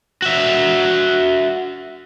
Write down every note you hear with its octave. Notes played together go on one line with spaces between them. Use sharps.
F#4 E5